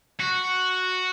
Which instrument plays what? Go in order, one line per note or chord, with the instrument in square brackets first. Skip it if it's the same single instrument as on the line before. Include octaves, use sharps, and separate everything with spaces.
[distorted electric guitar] F#4